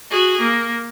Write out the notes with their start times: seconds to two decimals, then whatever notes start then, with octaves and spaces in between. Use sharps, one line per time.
0.10 F#4 G#4
0.41 A#3